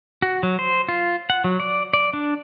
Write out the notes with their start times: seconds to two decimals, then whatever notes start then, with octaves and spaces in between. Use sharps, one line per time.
0.22 F#4
0.43 F#3
0.59 C5
0.89 F4
1.30 F#5
1.44 F#3
1.60 D5
1.93 D5
2.13 D4